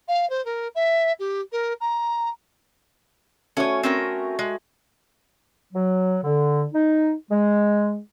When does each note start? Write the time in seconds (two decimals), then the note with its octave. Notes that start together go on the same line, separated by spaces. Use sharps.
0.08 F5
0.29 C5
0.45 A#4
0.75 E5
1.19 G4
1.52 A#4
1.80 A#5
3.57 A3 C#4 F#4 C#5 D#6
3.83 C4 C#4 A#4
4.39 G#3
5.73 F#3
6.23 D3
6.73 D#4
7.30 G#3